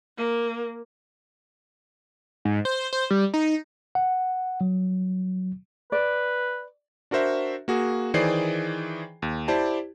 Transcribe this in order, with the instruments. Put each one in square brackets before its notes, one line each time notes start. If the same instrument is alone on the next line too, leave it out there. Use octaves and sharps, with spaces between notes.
[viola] A#3
[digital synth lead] G#2
C5
C5
G3
D#4
[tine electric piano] F#5
F#3
[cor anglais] B4 [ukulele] D5
[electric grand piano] D4 F#4 A#4 C5 E5
A#3 F#4 G#4
D#3 E3 G#4 C5 D5 C7
D#2
E4 G4 C5 D5 A5